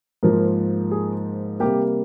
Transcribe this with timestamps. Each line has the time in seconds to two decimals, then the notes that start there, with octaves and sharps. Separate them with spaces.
0.23 G#2 F3 A#3 A#4
0.91 G#4
1.60 C3 G3 A#3 G4